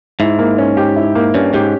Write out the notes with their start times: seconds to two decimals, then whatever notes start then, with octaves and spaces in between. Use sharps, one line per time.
0.20 G#2 E4
0.39 A#3
0.58 C#4
0.77 G4
0.96 E4
1.15 A#3
1.34 G2 C#4
1.54 G#2 G4